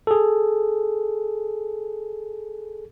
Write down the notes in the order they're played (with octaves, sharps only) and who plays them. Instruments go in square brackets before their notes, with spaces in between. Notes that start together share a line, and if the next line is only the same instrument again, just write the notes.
[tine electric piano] G#4 A4